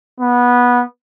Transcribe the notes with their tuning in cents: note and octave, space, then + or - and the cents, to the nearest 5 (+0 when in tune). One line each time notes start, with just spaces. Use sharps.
B3 -15